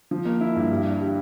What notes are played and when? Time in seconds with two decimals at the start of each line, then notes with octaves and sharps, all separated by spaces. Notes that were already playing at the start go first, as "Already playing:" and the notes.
0.11 F3
0.25 A#3
0.41 E4
0.56 G2
0.71 G3
0.85 D4
1.00 G4